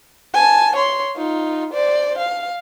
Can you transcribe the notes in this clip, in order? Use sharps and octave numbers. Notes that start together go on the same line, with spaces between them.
G#5 A5
C#5 C6
D#4 F4
C5 D5
F5